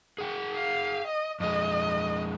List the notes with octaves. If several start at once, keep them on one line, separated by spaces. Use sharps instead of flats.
G#4 F#5 G5
F5
D#5
F2 G#3 D#5